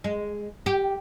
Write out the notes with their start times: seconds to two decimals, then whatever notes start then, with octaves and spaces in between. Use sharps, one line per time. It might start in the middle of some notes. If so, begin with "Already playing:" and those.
0.04 G#3
0.66 G4